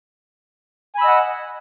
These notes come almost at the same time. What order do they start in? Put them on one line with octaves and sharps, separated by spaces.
G#5 B5 E6 D#5 F#5